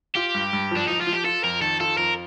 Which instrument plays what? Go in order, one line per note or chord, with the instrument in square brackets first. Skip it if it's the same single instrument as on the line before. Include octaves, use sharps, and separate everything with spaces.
[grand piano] F4 [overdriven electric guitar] G4
[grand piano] G2
G2
F3
[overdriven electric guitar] D4
[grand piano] F3 [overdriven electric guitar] D#4
[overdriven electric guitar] F4
[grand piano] F3
[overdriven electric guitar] G4
[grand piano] F4 [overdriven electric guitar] A4
[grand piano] F2 [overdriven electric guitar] A#4
[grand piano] D#3 [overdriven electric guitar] A4
[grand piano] F4 [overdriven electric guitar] A4
[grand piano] F2 [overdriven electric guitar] A#4